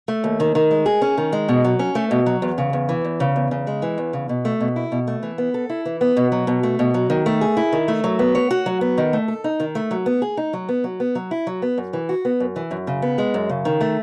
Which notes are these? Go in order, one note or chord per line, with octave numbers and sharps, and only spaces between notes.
A3
D#2
D#3
D#3
G#3
G#4
C#4
D#3
G#3
B2
F#3
C#4
A3
B2
F#3
E2
C#3
E2
E3
E2
C#3
E2
C#3
G#3
E3
E2
C#3
B2
A3
B2
E4
B2
A3
E3
B3
A4
E4
E3
B3
B2
F#3
B2
A3
B2
F#3
D#3
A3
G#4
E4
D#3
A3
F#3
B3
C#5
F#4
F#3
B3
D#3
A3
A4
D#4
D#3
A3
F#3
B3
G#4
D#4
F#3
B3
F#3
B3
F#3
E4
F#3
B3
F#2
E3
F#4
B3
F#2
E3
F#2
C#3
B3
G#3
F#2
C#3
D#3
A3